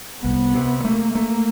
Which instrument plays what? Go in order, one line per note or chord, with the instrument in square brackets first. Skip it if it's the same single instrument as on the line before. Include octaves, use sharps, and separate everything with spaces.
[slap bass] C2 [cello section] B3
[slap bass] C3
[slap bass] A3 [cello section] A#3
[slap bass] A3